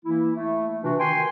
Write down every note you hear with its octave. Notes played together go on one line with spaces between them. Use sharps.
E3 A#3 E4
A3
C3 E3 D4 F4 F#4
D#3 G5 G#5 C6